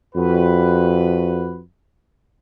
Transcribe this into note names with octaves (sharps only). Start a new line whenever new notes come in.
F2 F#4 B4